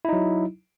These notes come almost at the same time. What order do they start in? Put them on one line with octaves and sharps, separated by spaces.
E4 D#4 F#3